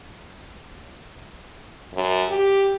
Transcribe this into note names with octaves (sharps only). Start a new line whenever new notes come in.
F#2
G4